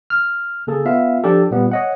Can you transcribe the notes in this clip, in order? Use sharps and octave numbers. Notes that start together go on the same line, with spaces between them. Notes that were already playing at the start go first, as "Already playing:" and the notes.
F6
C#3 A#3 G#4 A4
B3 F4 E5 F5
F3 D4 G4 A4
A#2 G3 B3
C#5 D#5 F#5